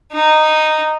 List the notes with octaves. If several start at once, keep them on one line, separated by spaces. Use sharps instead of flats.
D#4